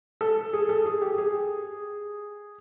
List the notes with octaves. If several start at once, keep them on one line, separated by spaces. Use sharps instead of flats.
A4
G#4
A4
G#4
G4
G#4